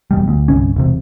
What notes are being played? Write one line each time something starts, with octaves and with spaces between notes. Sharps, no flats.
E1 B2 G3
D2
G1 C2 C#4
E1 C3